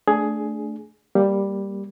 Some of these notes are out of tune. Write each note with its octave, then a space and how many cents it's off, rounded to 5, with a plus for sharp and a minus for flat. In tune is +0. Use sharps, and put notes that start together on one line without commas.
A3 +0 D4 +0 G#4 +10
G3 +5 A#3 +0